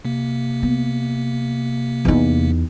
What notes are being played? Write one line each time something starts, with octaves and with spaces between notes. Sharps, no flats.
C3 A#3
B3
E2 D#4